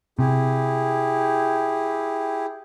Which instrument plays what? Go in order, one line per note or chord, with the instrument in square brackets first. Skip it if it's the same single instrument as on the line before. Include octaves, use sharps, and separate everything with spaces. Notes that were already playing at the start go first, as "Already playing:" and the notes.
[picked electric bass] C3 [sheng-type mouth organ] E4 G4 G#4